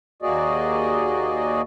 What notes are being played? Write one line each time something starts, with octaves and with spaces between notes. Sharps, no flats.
D#2 A#3 F#4 G#4 D5 D#5